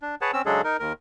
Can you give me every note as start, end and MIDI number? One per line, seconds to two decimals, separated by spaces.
0.02 0.15 62
0.21 0.31 68
0.21 0.31 71
0.21 0.31 73
0.21 0.31 78
0.21 0.31 81
0.33 0.42 60
0.33 0.42 61
0.33 0.42 88
0.46 0.61 49
0.46 0.61 54
0.46 0.61 56
0.46 0.61 62
0.46 0.61 68
0.46 0.61 69
0.64 0.77 63
0.64 0.77 70
0.79 0.93 39
0.79 0.93 70